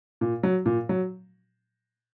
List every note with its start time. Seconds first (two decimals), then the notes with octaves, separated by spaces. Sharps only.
0.21 A#2
0.43 F#3
0.66 A#2
0.89 F#3